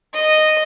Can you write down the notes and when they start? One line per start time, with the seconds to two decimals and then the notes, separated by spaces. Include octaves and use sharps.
0.14 D#5